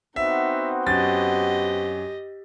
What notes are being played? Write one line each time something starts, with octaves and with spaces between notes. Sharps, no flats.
B3 C4 D#4 F#4 E5
F#2 G4 D#5 A6